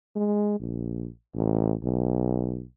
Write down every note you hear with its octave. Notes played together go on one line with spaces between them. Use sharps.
G#3
A#1
A1
B1